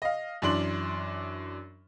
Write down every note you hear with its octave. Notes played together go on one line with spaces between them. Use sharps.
D#5 F5
F#2 E3 D4 C6 F#7